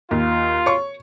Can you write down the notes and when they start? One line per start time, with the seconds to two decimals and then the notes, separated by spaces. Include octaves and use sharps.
0.11 D#2 F4
0.66 C#5 C#6